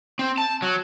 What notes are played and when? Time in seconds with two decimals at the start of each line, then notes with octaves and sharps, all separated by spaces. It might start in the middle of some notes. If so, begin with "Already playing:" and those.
0.19 C4
0.38 A5
0.62 F#3